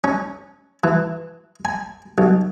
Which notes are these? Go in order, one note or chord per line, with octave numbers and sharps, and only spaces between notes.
C#4
E3
G#5
B1